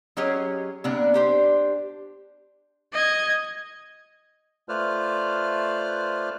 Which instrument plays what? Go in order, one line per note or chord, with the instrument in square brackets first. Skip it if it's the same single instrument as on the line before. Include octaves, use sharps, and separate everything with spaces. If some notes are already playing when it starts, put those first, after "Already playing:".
[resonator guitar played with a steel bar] F#3 C#4 G4 G#4 C#5 D#5
C3 A#3 B3 D4
D4 G4 C5
[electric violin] D#5 G#6
[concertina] A3 F4 B4 C5 D5 F6